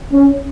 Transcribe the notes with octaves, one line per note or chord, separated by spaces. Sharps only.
C#4